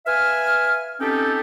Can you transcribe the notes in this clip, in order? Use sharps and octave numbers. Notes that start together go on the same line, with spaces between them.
B4 E5 F5 G#5 F6
C4 C#4 D#4 G4 A4